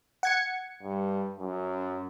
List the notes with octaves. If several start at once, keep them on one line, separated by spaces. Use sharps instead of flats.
F#5 G#6 C#7
G2
F#2